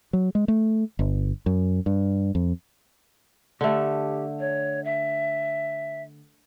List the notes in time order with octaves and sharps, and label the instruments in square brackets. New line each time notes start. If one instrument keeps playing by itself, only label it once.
[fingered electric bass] F#3
G#3
A3
G1
F#2
G2
F2
[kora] D3 A3 [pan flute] G4
[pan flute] C#5
E5